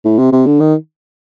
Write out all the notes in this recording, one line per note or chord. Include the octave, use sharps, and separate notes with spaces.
A2
C3
C3
D3
D#3